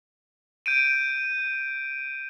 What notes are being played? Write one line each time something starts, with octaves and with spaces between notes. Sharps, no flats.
G6 D7 D#7